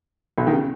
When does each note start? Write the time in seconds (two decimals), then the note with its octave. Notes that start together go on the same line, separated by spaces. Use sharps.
0.38 B1 B2
0.47 D#3
0.53 C#3